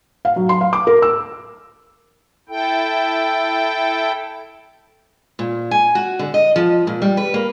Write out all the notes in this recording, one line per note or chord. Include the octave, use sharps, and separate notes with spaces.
F5
F#3
C6
F5
D6
A#4
E6
E4 A4 G5
A#2
G#5
F#4
D3
D#5
F3
A#2
G3
B4
A#3